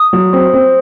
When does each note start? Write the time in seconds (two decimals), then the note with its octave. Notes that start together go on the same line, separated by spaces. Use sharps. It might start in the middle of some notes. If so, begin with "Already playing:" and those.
Already playing: D#6
0.13 F#3
0.33 C4
0.53 C4